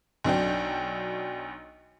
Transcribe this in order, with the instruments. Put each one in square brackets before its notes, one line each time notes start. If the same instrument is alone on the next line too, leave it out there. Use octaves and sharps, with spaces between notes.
[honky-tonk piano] B1 F#3 D4 G5